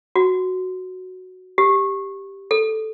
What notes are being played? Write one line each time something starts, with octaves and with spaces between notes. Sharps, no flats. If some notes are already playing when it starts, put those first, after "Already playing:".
F#4
G4
A4